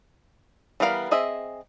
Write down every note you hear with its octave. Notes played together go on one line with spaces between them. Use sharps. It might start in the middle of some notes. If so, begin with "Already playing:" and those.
E3 G3 B3 A#4 F5
C4 G#4 D#5 E5